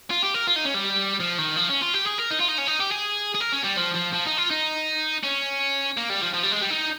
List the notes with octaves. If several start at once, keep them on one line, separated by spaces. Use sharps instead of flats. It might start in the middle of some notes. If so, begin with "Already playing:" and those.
F4
G4
A#4
F4
D#4
C#4
G3
F3
D#3
F3
C#4
F4
G4
G#4
A#4
D#4
F4
D#4
C#4
D#4
G4
G#4
G#4
A#4
C#4
G3
F3
F3
F3
D#4
F4
D#4
C#4
A#3
G3
F3
F3
G3
G#3
G3
D#4